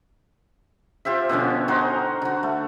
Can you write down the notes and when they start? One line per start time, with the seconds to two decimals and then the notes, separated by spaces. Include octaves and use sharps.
1.05 F4 G4 C5 E5
1.29 B2 D3 F3 C#4
1.68 D#4 F#4 A#4 C5
2.22 D3 F#4
2.43 A3